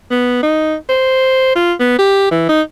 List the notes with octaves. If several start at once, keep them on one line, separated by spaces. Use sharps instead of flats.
B3
D#4
C5
F4
B3
G4
E3
D#4